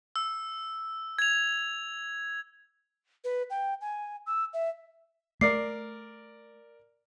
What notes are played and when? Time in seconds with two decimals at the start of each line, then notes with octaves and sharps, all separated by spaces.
0.16 E6
1.19 G#6 F7
3.24 B4
3.50 G5
3.81 G#5
4.26 E6
4.53 E5
5.41 A3 A#4 D5 D6 C7